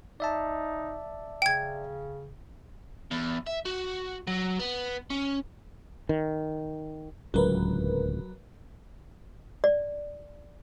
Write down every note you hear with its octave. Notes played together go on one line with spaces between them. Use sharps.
D#4 D5 E5 A5
C#3 G5 G#6
E2
E5
F#4
F#3
B3
C#4
D#3
D1 C#2 F#3 A#4 B4
D5